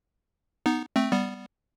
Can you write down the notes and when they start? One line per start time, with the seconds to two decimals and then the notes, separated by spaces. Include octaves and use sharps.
0.66 B3 D#4
0.96 A3 C4
1.12 G3 B3